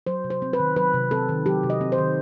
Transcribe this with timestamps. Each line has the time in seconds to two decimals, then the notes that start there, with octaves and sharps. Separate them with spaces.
0.07 F#3 C5
0.24 C3
0.30 C5
0.42 C4
0.53 B4
0.60 D#3
0.76 F#3 B4
0.94 C3
1.11 C4 A4
1.29 D#3
1.46 F#3 G4
1.63 C3
1.70 D#5
1.81 C4
1.92 C5
1.98 D#3